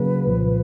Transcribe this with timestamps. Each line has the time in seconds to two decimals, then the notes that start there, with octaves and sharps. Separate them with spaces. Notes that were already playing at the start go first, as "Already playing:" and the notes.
Already playing: C#3 F#3 A#3 B4
0.27 C2 A#2 F3